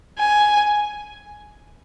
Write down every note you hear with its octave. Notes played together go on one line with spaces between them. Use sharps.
G#5